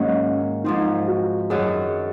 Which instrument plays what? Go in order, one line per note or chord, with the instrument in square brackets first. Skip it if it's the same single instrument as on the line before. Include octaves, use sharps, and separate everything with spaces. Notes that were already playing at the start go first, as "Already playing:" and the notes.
Already playing: [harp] G#2 D#3 F#3 A#3 [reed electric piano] C#4
[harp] G#2 F3 C4 [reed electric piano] D#4
[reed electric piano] F#4
[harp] F#2 D#3 F#3 [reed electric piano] G#4